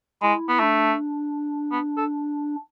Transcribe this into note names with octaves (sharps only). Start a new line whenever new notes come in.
G#3 E4
B3
A3 D4
B3
A4